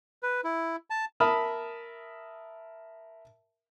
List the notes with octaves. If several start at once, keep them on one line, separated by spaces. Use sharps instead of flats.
B4
E4
A5
A#4 E5 A5 B5 D#6 F6